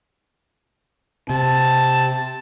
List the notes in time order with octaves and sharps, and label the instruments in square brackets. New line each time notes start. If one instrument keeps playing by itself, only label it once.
[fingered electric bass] C3 [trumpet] A5